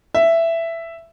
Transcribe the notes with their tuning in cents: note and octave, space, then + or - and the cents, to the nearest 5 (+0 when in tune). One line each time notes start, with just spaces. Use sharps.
E5 +10